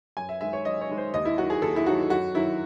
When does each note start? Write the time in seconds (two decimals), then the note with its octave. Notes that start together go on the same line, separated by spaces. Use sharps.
0.17 F#2 G#5
0.29 E5
0.41 D#3 G#3 E5
0.53 C#5
0.65 F#2 D#5
0.81 C#5
0.89 D#3 G#3
0.97 C5
1.14 D#2 D#5
1.25 E4
1.38 D#3 F#3 F#4
1.50 G#4
1.62 D#2 A4
1.76 E4
1.86 D#3 F#3 F#4
2.10 F#2 F#4
2.35 D#3 F#3 E4